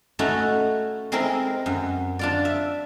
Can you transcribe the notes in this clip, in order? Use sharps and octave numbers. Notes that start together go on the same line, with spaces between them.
A3 C#4 D#4 E4 F#4
G#3 C4 D#4 E4 A#4
F#2
D4 F4 D5
E5